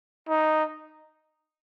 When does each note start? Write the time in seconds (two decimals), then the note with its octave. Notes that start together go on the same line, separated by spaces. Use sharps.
0.29 D#4